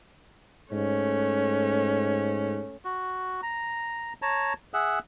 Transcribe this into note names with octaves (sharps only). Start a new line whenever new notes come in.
G#2 A3 C#4
F#4
A#5
C#5 A5 A#5
G#4 E5 F#5